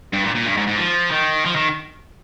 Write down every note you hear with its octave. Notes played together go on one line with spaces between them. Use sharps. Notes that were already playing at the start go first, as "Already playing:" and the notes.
G2
A#2
A#2
G2
G#2
G#2
F3
D#3
F3
D#3